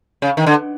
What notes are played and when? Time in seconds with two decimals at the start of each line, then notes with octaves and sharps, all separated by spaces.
0.22 C#3
0.37 D#3
0.46 D3